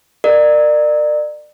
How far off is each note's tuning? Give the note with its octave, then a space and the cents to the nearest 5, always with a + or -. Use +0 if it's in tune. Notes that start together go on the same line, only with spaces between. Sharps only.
A#4 +0 D5 +30